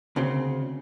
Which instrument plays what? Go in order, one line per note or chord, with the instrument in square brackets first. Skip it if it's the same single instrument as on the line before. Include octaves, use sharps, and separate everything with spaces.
[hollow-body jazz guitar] D2 C#3 C4